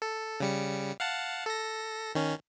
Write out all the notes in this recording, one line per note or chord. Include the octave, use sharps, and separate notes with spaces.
A4
C#3 G3 C#7
F5 F#5 A5
A4 A#6
D#3 C#4